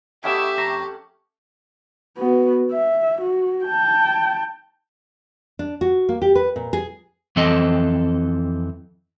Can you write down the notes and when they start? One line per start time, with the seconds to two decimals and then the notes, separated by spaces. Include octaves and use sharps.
0.24 A3 C#4 E4 G4 D#5 E5 F#5 G5
0.58 F2 C5 A#5 C#6
2.17 B3 F#4
2.71 E5
3.21 F#4
3.65 G5 A5
5.59 D4
5.81 F#4
6.09 A#3
6.22 G4
6.35 B4
6.56 A#2
6.73 G#4
7.36 F2 E3 C4 A4 D#5